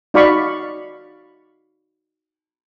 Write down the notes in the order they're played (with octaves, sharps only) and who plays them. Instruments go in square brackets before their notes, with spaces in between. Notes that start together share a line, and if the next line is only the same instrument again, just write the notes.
[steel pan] D#4 F#4 D5 F5 B5 C#6